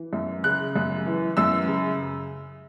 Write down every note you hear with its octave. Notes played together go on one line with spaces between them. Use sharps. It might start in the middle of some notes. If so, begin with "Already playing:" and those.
Already playing: E3
F#2
C#3 F#6
F#2
E3
F#2 E6
C#3